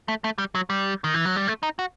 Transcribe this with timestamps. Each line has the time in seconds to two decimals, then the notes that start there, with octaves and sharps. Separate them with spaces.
0.08 A3
0.24 A3
0.38 G3
0.55 F#3
0.70 G3
1.04 D#3
1.14 E3
1.25 F#3
1.36 G3
1.48 A3
1.63 D#4
1.79 F#4